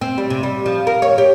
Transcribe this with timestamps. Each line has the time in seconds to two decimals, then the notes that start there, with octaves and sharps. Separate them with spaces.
0.01 C4
0.18 G3
0.30 C3
0.43 G3
0.66 F3
0.87 A#4
1.02 C#5
1.18 G4